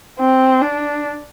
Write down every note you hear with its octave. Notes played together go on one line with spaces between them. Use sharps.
C4
D4